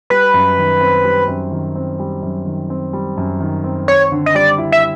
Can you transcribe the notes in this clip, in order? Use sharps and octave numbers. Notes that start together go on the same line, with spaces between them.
G3 B4
F#2
D#3
C4
G3
F#2
D#3
C4
G3
F#2
D#3
C4
G3
F#2
D#3
C4
C4 C#5
D3
D#5
G3 D5
E4
E5